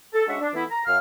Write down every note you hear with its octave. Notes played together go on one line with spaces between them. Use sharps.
A4
G#3 C#4 D4 F#4 E5 F#5
D4
E3 A3 B3 E4
A#5
F#2 F5 F6